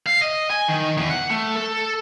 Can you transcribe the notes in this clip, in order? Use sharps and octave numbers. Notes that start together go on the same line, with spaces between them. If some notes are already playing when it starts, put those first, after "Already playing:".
F5
D#5
G#5
D#3
E2
F#5
A3
A4